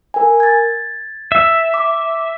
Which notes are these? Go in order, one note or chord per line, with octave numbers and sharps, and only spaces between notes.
A#4 G#5
G#6 A6
E5
D6